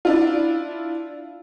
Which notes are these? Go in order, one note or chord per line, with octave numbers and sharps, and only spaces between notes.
D4 E4 F4